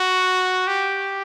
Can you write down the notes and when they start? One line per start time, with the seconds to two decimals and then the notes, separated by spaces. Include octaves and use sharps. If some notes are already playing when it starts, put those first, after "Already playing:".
Already playing: F#4
0.67 G4